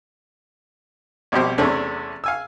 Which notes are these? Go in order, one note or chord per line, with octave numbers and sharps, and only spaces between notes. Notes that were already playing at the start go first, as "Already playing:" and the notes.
A#1 B2 G3 C4 G4 C5
E2 C3 A3 C#4 D4
F5 G#5 E6